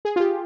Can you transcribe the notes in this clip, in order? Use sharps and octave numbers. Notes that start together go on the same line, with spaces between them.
G#4
F4
G4